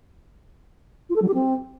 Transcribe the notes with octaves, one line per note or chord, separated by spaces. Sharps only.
F4
A4
F#3
G4
C4